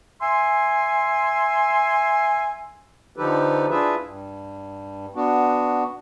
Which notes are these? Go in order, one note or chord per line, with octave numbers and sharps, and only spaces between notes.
E5 G#5 C6
D3 F3 D#4 G4 A4 B4
D4 E4 F4 G#4 B4 E5
G2
B3 D4 F#4